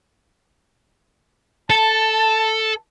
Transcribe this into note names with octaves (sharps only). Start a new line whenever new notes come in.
A4 A5